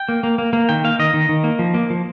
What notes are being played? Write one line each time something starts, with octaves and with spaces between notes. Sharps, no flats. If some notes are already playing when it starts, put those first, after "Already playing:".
Already playing: G5
A#3
A#3
A#3
A#3
D#3 G5
A#3 F5
D#3 D#5
D#3
D#3
A#3
F3
A#3
F3